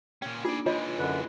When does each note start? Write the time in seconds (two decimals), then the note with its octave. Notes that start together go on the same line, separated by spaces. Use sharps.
0.22 A#2 C#4 G5
0.45 A#3 D4 D#4 F4 G#4 D5
0.66 E3 G#3 F4 C#5 D#5
0.99 F#2 D3 B4